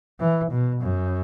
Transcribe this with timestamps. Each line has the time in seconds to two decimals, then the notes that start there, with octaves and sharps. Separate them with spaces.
0.20 E3
0.51 B2
0.81 F#2